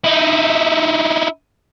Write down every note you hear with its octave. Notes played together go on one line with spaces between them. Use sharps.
D#4 E4